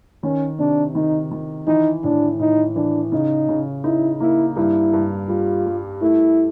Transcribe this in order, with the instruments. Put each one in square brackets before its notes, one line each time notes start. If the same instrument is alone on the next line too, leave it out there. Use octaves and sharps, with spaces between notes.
[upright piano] D#3 [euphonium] C#4
[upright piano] C3 [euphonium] D4
[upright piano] D#3 [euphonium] D#4
[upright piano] D#3
[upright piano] E3 [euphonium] D#4
[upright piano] A2 [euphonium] D4
[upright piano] A2 [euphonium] D#4
[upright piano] E3 [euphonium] D4
[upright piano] C#3 [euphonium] D#4
[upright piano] C#3
[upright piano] D#4 [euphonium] E4
[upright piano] A#3 [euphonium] E4
[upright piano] G2 [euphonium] E4
[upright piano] G2
[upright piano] G3 [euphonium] F4
[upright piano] G3
[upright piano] A3 [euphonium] E4